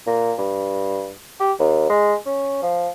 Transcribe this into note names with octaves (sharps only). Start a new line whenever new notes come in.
A#2
G2
G4
D#2
G#3
C#4
F3